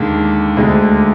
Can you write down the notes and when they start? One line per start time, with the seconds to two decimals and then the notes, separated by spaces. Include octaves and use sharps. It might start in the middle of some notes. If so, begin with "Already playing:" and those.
Already playing: D#2 D3 G#3
0.57 D2 D3 G#3